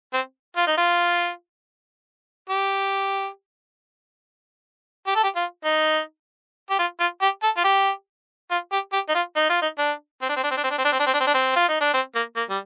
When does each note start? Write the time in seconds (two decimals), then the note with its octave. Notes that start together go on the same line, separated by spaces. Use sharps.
0.13 C4
0.56 F4
0.67 D#4
0.78 F4
2.50 G4
5.07 G4
5.15 A4
5.23 G4
5.36 F4
5.65 D#4
6.70 G4
6.79 F4
7.00 F4
7.22 G4
7.43 A4
7.57 F4
7.64 G4
8.51 F4
8.72 G4
8.93 G4
9.09 D#4
9.15 F4
9.36 D#4
9.49 F4
9.62 D#4
9.78 D4
10.22 C4
10.29 D4
10.36 C4
10.43 D4
10.51 C4
10.57 D4
10.64 C4
10.71 D4
10.78 C4
10.85 D4
10.92 C4
10.99 D4
11.06 C4
11.14 D4
11.20 C4
11.27 D4
11.34 C4
11.56 F4
11.69 D#4
11.81 D4
11.94 C4
12.15 A#3
12.36 A#3
12.50 G3